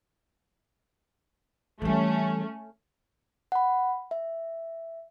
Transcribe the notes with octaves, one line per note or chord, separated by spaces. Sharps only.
E3 G3 A3 C#4
F#5 B5
E5